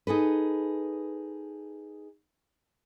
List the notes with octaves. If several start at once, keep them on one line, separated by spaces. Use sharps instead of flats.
D#4 G#4 A4 B4